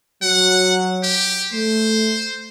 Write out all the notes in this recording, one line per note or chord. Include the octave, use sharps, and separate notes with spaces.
F#3 F#5
G4
A3 C5